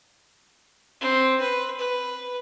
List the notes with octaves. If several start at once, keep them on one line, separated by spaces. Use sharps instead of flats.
C4
B4
B4